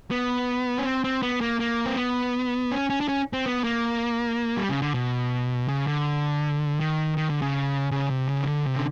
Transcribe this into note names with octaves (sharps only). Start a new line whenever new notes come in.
B3
C#4
C4
C4
B3
A#3
A#3
C4
B3
C#4
C#4
D4
C#4
C4
B3
A#3
G3
C#3
D3
B2
C#3
D3
D#3
D#3
D3
C#3
C#3
C3
C#3
D#3
D3
C3
D3